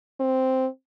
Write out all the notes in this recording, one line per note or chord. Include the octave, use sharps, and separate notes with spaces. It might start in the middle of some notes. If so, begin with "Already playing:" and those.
C4